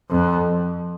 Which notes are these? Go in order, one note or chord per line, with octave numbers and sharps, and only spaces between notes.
F2